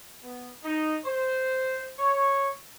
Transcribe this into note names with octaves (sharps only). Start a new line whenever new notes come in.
B3
D#4
C5
C#5